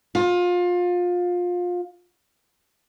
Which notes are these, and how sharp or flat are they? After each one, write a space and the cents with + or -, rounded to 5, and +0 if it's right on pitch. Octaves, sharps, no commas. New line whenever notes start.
F4 +25